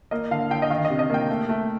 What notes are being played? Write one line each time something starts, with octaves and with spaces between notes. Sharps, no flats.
A#3 D#5
D3 F5
D3 G5
D#5
D#3 F5
D#5
C3
D#5
A#3 G5
A3
A3